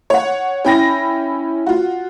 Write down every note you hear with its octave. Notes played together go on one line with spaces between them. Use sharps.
C#5 F#5
C#4 E4 G5 B5 A#6
F4 F#4